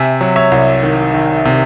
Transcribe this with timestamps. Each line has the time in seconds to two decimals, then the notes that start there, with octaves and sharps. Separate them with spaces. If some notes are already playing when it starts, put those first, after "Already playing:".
Already playing: C3 E5 G#5
0.21 F#3
0.36 C#5 E5
0.51 C2
0.83 D#3
1.14 D#3
1.45 C3